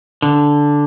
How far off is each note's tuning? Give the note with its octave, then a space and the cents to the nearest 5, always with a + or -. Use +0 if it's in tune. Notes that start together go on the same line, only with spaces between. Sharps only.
D3 -5